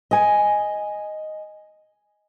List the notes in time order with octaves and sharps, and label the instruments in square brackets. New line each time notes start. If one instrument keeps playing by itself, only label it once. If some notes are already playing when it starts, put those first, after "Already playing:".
[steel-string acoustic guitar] D#5 G#5